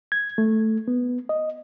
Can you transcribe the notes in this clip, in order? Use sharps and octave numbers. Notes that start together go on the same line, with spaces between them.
G#6
A3
B3
D#5